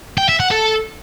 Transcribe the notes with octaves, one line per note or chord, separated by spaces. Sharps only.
G5
E5
F#5
A4